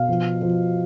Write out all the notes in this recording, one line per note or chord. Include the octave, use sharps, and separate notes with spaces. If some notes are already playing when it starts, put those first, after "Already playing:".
Already playing: B2 F5
F3
F3